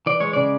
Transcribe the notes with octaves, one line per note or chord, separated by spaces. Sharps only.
E3 D5
G#3 C#5
C#3 D5